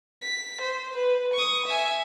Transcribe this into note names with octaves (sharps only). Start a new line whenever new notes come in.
B6
C5
B4
C#6 D#6
E5 G#5